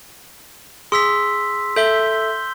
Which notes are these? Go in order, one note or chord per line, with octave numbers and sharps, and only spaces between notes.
G#4 C6 E6 B6
A4 E5 G6 G7